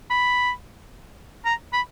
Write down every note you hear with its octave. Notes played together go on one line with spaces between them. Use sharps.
B5
A#5
B5